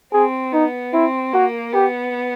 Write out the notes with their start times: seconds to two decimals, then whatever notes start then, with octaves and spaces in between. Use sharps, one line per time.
0.13 C4 G#4
0.53 B3 D#4
0.93 C4 E4
1.33 A#3 F#4
1.74 B3 G4